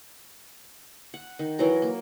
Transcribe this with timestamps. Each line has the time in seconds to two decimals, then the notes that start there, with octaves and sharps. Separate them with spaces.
1.14 F#5
1.39 D#3
1.59 E3 F#3 A#4 A#5
1.82 A#3